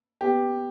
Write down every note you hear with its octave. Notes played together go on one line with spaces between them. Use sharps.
B3 G4